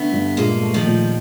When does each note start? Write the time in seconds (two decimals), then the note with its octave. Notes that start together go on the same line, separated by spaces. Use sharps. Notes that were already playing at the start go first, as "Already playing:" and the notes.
Already playing: D3 A3 B3
0.12 G2
0.37 A#2 G#3 A#3
0.62 A3
0.74 D#3 F3
0.86 A#2